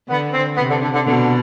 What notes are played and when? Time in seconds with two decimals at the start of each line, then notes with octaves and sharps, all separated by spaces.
0.09 D3 B3
0.34 C4
0.57 C3 B3
0.70 D3
0.81 D3
0.93 D3
1.05 B2 D3